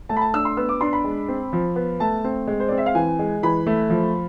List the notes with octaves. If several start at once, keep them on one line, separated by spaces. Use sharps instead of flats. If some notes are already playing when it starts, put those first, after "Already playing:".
A3 A5
B5
A5
D4 E6
C6
B3 E6
D6
D4 C6
B5
G#3
C4
F3
B3
A3 A5
C4
G#3
C5
C4 D5
E5
F5
E3 G#5
G#3
E3 B5
A3
F3